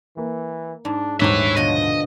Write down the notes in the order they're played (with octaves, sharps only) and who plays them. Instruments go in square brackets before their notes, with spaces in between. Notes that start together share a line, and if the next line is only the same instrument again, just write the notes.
[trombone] E3 [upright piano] A#3
[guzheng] G#2 [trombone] D4
[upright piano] D#1 G#2 C#6 [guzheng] D4 G4 [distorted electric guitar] B4 E5 [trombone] C#5
[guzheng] B2 D3 F3 [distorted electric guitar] D#5